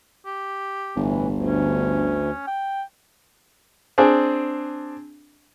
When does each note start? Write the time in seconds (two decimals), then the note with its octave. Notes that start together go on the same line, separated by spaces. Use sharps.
0.26 G4
0.96 G1 A2 E3
1.31 D2
1.47 C#4
2.48 G5
3.98 C4 D4 G#4